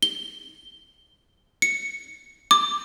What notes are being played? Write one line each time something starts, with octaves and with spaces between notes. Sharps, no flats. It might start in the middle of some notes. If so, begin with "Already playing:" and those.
G7
C#7
D6